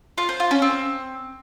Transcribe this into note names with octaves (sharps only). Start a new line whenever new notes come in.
F4
C5
F4
C#4
C4